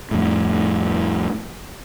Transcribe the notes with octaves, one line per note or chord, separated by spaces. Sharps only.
F2 A2